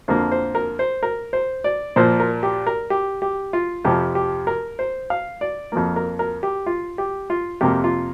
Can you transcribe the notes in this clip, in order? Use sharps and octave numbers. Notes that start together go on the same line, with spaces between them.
F2 D3 F3 A#3 C5
C5
A#4
C5
A#4
C5
D5
A#2 F3 A#3 C5
A#4
G4
A#4
G4
G4
F4
F2 C3 F3 G4
G4
A#4
C5
F5
D5
F2 F3 A#3
A#4
A#4
G4
F4
G4
F4
F2 C3 A#3 G4
F4